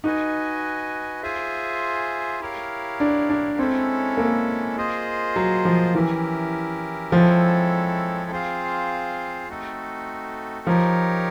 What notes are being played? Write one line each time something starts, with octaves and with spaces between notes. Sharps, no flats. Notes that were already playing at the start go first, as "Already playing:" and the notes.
D#4 F#4 B4 D#5 G#5
F4 G#4 C5 E5 G#5
E4 G4 A#4 C#5 F5
D4
D4
G#3 C4 C#4 E4 A4 C#5
A#3
F4 G#4 C5 D#5
F#3
F3
E3 C#4 E4 G4 A#4
F3 G#3 C4 E4 A4 C#5
C4 F4 G#4 C5 F5
A3 C4 D#4 F#4 A4
F3 D#4 G4 A#4 C#5